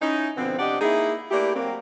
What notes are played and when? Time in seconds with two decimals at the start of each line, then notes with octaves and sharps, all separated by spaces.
0.01 C#4 D#4 E4
0.37 B2 D3 F3 B3 C4
0.59 C3 D4 G4 D5 D#5 F#5
0.81 A#3 D#4 E4 G#4
1.31 A3 A#3 D4 E4 G4
1.56 F#3 A#3 C4